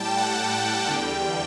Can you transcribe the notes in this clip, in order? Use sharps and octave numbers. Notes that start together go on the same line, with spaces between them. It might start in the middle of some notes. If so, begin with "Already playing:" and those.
Already playing: A2 G3 G5 A5
F#5
G5
E2 D3 G3